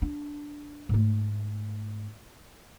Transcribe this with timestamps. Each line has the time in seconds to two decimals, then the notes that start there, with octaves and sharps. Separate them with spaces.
0.02 D4
0.89 G#2 A3